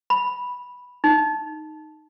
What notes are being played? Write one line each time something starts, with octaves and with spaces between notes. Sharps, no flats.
B5
D#4